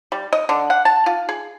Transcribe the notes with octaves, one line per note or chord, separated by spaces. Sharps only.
G3
D#5
D3
F#5
A5
F4
G#4